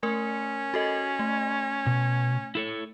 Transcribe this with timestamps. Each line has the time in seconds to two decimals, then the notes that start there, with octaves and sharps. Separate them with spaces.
0.03 A3 C#4 A#4
0.74 F#4 A4 D#5
1.19 A3
1.86 B2
2.55 E4 A4 C#5